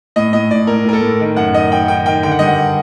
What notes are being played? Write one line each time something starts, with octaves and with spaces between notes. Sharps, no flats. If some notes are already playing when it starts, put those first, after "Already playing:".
A2 D#5
A2 D#5
A2 D5
A2 A#4
A2 A#4
A4
A2
D#3
F#2 F#5
D#3 D#5
D#3 G5
D#3 G5
D#3 G5
D3 G5
F#5
G2 D#5
F#5